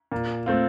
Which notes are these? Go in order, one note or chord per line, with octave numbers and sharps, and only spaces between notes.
A#2
A3 C4 F4